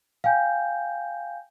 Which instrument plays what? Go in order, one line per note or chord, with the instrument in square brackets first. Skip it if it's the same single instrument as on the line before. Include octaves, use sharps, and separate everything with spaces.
[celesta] F5 G5 G#5 G6